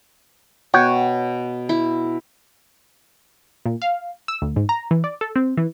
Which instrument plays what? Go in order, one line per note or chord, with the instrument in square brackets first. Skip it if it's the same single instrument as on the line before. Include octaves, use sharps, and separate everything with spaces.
[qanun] B2 [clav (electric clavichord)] C#5 F#5 G5
[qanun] E4
[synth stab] A#2
F5
E6
D2
G#2
A#5
E3
D5
A4
C4
E3